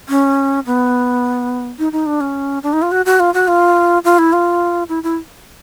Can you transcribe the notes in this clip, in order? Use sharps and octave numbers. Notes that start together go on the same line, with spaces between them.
C#4
B3
D#4
D#4
D4
C#4
D4
D#4
F4
F#4
F#4
F4
F#4
F4
F4
E4
F4
E4
E4